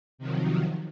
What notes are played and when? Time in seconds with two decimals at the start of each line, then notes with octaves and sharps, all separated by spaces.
0.18 C3 D#3 F3 F#3